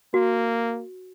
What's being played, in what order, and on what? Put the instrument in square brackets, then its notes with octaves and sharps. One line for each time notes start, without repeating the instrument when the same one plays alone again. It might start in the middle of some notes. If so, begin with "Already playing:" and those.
[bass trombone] A#3 [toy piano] F#4